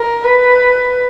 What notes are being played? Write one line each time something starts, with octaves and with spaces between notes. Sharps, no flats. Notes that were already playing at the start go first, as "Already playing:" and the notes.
Already playing: A#4
B4